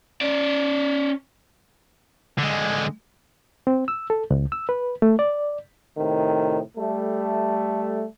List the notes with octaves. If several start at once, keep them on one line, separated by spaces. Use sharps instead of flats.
C#4 D5
D3 G#3
C4
E6
A4
C#2
E6
B4
A3
D5
A2 C3 D#3
G3 A3